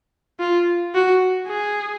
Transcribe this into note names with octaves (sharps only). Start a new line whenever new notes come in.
F4
F#4
G#4